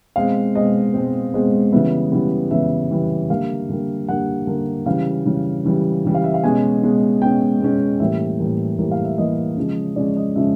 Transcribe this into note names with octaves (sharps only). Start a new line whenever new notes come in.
B2 G#3 C4 F5
B2 G#3 C4 D#5
B2 G#3 C4
B2 G#3 C4
C#3 E3 G3 B3 E5
C#3 E3 G3 B3
C#3 E3 G3 B3 E5
C#3 E3 G3 B3
D3 G3 A#3 F5
D3 G3 A#3
D3 G3 A#3 F#5
D3 G3 A#3
C#3 E3 G3 F5
C#3 E3 G3
C#3 E3 G3
C#3 E3 G3
F5
E5
F5
B2 G#3 C#4 G#5
B2 G#3 C#4
B2 G#3 C#4 G5
B2 G#3 C#4
A2 E3 G3 A#3 E5
A2 E3 G3 A#3
A2 E3 G3 A#3
F5
E5
A2 E3 G3 A#3 D#5
C#3 F3 G#3 C#4
C#3 F3 G#3 C#4 D5
D#5
C#3 F3 G#3 C#4 E5